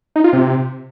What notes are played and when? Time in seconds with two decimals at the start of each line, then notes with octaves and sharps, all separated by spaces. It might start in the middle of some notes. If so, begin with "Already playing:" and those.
0.16 D#4
0.24 F4
0.33 C3